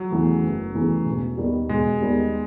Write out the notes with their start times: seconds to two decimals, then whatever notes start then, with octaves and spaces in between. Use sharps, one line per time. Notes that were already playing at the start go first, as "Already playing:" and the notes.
Already playing: F#3
0.11 E2 C#3 E3 A3
0.43 F#1
0.75 E2 C#3 E3 A3
1.05 E1
1.37 D#2 D#3 G3 B3
1.69 E1 G#3
2.01 D#2 D#3 G3 B3